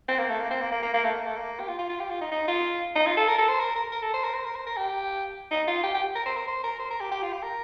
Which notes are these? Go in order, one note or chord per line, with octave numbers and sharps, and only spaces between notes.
C4
A#3
A3
A#3
C4
A#3
A#3
A#3
A#3
A3
A#3
A3
A#3
G4
F4
F4
F4
G4
F4
D#4
D#4
F4
D#4
F4
A4
A#4
A4
C5
A#4
A#4
A#4
A4
C5
A#4
C5
A#4
C5
A#4
G4
D#4
F4
G4
G4
A#4
C5
A#4
C5
A#4
C5
A#4
G4
G4
F4
G4
A#4